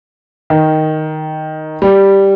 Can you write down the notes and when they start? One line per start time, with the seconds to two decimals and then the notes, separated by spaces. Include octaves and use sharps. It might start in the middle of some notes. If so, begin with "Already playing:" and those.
0.50 D#3
1.82 G3